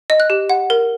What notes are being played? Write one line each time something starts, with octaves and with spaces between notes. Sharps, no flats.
D#5
F#6
G4
F#5
A#4